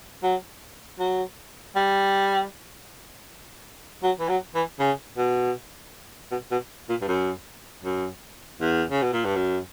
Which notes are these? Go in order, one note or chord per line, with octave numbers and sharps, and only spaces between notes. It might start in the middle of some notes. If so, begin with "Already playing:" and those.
F#3
F#3
G3
F#3
E3
F#3
E3
C#3
B2
B2
B2
A#2
G2
F#2
F#2
E2
C#3
B2
A#2
G2
F#2